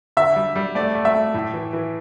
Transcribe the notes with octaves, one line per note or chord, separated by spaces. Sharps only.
D3 E5
G3
G3
A3 D5
A3
E5
A3
A2
E3
E3